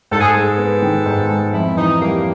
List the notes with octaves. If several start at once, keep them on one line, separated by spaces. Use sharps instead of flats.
G#2 A4
G#4
A4
G#3
B3
D#3
G#2
G#3
F2 E4
E3 D#4
G3 A#3